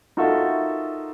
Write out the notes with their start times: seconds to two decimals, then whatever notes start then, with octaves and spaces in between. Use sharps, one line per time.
0.17 D#4 F4 F#4 A4 A#4 E5